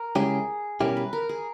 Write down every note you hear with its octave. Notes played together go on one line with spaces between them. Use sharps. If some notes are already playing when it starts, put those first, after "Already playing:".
Already playing: A#4
C#3 G#3 C#4 E4 G4 G#4
B2 G3 C#4 E4 G4 A#4
B4
A#4
G#4